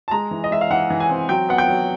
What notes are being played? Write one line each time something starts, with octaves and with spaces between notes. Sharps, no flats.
A5
G#3 A#5
E3
D#5
G#3 E5
F5
E3 F#5
E3
G#5
C4
F#3 G5
B3 F#5
G5
F#3